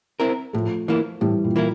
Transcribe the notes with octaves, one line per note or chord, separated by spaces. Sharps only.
C4 E4 A#4
A2 F3 A3
E3 A#3 E4
A2 E3 G3
A#2
E3 A#3 E4